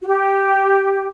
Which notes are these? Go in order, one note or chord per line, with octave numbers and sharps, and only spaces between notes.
F#4
G4